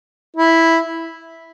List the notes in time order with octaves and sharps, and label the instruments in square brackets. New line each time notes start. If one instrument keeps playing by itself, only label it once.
[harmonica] E4